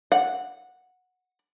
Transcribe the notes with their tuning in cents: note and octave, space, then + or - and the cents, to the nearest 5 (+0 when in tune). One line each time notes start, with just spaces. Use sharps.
F#5 -10